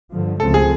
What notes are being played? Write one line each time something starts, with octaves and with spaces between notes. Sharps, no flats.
G2 D3 F3
C#2 C#3 F3 A3 C4 A4
G#4